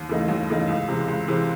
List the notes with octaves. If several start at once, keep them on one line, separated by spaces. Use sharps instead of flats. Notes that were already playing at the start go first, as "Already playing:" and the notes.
Already playing: D#2
C#3 E3 A3 D#4
D#2
C#3 E3 A3 D#4
C#2
C3 E3 G#3
C#2
C3 E3 G#3